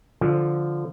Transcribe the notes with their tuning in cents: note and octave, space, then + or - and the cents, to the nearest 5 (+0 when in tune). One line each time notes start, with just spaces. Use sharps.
D3 +0 F3 +0